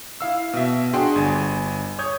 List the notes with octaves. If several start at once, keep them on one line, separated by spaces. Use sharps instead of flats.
E4 F5 E6
B2 E5
D4 F#4 G#4 G5 C6
G1 G#5
C#5 D#6 G6 G#6